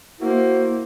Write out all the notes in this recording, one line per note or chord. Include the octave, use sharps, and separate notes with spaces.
A#3 E4 F#4 C5